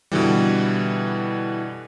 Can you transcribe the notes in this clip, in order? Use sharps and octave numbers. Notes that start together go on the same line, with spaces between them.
B2 D3 E3 G3